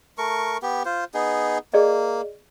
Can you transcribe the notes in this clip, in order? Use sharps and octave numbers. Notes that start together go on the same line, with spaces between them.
A3 A#4 C#6
B3 G4
F4 C5
B3 D#4 G#4
A#3 G#4 D5 D#5